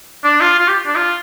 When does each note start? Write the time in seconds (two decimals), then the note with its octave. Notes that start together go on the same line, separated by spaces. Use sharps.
0.24 D4
0.41 F4
0.59 F4
0.68 G4
0.87 D4
0.95 F4